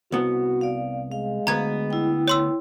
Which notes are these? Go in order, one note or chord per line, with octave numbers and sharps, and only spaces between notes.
C2 B3 F#4
D5 F5
G#3 F5
D2 B3 B4 A#5 G#6
E4 G5
C#5 C6 E6